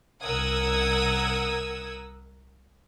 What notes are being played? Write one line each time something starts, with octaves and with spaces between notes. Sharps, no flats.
C2 A#4 F#5 D#6 E6 G#6